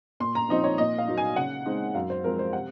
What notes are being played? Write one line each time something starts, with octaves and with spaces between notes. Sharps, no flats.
A#2 C6
A#5
F3 C4 D#4 D#5
C#5
A#2 D#5
F5
F#3 A#3 D#4
G#5
C#3 F#5
G#3 C4 D#4
F#2 F5
C5
F3 G#3 C4 A#4
C5
C3 F#5